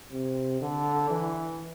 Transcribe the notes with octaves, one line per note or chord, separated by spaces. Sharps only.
C3
D3
E3